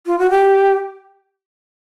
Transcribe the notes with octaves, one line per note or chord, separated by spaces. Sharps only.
F4
F#4
G4